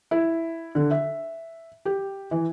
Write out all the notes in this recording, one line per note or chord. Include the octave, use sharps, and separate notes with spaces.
E4
D3
E5
G4
E3